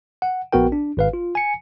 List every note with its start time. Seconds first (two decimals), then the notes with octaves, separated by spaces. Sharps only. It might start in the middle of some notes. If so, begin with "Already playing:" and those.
0.22 F#5
0.52 A#1 B3 F#4 A#4 G5
0.72 D4
0.97 G#1 B4 F5
1.13 F4
1.35 G#5 C#7